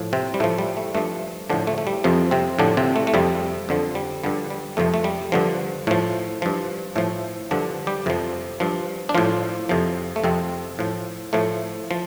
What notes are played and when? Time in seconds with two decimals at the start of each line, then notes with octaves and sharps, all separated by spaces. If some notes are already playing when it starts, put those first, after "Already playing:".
Already playing: A2 F3
0.13 C3 C4
0.34 G3
0.40 A2 F3 A3
0.58 G3
0.77 A3
0.95 G2 F3 A3
1.50 A2 D3 F3 D4
1.67 A3
1.78 A3
1.87 G3
2.04 F2 C3 F3
2.31 C3 C4
2.59 A2 D3 F3 D4
2.77 C3 C4
2.96 A3
3.07 A3
3.14 F2 C3 F3 G3
3.69 F2 D3 F3
3.95 G3
4.24 G2 D3 F3 G3
4.50 G3
4.77 F2 C3 F3 A3
4.94 A3
5.04 G3
5.32 G2 D3 F3
5.87 A2 F3 A3
6.42 G2 F3
6.96 A2 F3 A3
7.51 G2 D3 F3 D4
7.87 G3 G4
8.06 F2 C3 F3
8.60 G2 F3
9.09 D4
9.15 A2 F3 F4
9.69 F2 C3 F3
10.16 A3
10.24 F2 C3 F3 C4
10.79 A2 F3
11.33 A2 F3 A3
11.91 F3